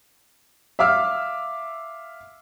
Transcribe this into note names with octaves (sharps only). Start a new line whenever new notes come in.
E5 F5 D6 E6 F6